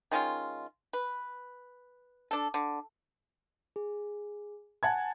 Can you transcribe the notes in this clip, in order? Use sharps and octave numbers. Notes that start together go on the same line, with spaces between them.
D#3 G#3 C#4 F4
B4
D4 A4
D3
G#4
F#5 G#5 A5 G#6